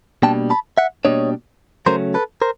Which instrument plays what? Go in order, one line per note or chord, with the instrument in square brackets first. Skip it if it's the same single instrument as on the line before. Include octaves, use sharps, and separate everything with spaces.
[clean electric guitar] B2 G3 A#3 D4 G5 A5
A5 B5
E5 F#5
B2 G3 A#3 D4 C#5 D#5
C#3 F#3 A3 C#4 A#4 C5
A4 B4
A#4 C5